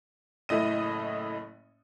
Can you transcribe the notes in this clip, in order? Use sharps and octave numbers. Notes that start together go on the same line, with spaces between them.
F#1 A2 A3 E4 D#5 D#7